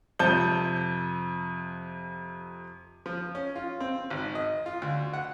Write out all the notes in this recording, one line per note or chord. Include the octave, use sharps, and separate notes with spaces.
F2 C3 A5 G6 G7
F3
C#4
F4
C4
G#1
D#5
F4
D2
F#5